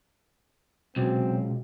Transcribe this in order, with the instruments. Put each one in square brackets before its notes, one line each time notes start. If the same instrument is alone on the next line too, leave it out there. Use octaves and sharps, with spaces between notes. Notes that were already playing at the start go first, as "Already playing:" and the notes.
[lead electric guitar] C#2 [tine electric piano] B2 [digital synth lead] F#3 [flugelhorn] C4